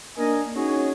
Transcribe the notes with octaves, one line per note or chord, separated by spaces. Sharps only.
A#3 D4 A#4 D#5 G#5
C#4 D#4 F#4 G#4 C#5